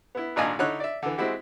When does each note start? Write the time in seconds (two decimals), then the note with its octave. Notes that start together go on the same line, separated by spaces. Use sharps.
0.15 B3 E4
0.36 G#1 A#2 D4 D#5 F5 G#5
0.59 D3 D#4 E4 C#5 F#6
0.80 D5 E5
1.03 D3 E3
1.17 G#3 C4 E4 F#4 G4